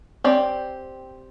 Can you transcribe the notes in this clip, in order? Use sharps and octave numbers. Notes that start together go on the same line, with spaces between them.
C4 G4 D5